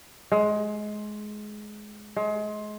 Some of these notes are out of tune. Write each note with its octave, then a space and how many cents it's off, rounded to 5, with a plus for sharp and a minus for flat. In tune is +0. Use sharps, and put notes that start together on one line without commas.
G#3 +20
G#3 +30